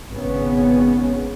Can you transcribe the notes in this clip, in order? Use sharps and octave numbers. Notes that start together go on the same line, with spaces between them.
G#1 C#3 B3 C#4